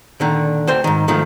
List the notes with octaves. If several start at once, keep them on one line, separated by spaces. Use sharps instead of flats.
A#2 D3 D#3
D2 C5 G5
G#2 D#3
G#2 D#3 F3 A3